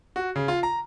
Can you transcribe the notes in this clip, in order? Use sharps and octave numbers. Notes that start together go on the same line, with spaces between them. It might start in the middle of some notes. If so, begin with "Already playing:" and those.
F#4
C#3
F4
A#5